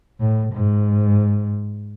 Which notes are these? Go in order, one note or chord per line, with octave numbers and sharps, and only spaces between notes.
A2
G#2